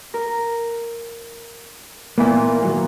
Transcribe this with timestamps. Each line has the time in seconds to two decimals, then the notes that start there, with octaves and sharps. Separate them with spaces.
0.14 A#4
2.18 A#2 E3 A#3 B3
2.63 D#3 F#3 A#3